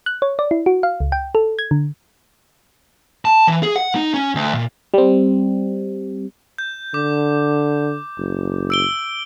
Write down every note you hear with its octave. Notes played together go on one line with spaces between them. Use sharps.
F#6
C#5
D5
E4
F#4
F5
C#2
G5
A4
G#6
D3
A5
E3
G#4
F#5
D#4
C#4
D2
A#2
G3 C4
G6
D3 D6
F#1
E6 D7 G7